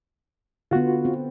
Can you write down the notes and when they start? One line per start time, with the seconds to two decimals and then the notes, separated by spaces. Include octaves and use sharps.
0.71 D3 B3 F4 F#4
1.05 C4